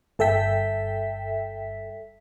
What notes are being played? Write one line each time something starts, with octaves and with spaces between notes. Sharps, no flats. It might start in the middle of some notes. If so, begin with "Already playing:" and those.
G1 A4 E5 G5 B6